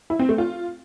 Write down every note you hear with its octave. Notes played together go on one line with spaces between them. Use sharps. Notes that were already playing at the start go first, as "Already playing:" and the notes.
E4
C4
A3
F4